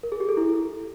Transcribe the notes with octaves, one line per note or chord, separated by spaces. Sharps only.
A#4
G#4
G4
A4
E4